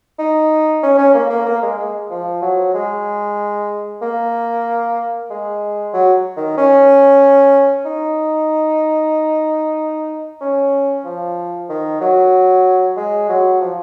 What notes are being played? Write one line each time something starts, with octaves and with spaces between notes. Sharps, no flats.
D#4
C#4
C#4
A#3
A#3
A#3
G#3
G#3
F3
F#3
G#3
A#3
G#3
F#3
D#3
C#4
D#4
C#4
F3
D#3
F#3
G#3
F#3
F3